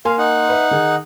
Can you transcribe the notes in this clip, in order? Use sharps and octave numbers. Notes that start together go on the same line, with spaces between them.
A#3 F5 G#5 C6
D#4 F#5
B4 E5
D#3 G#4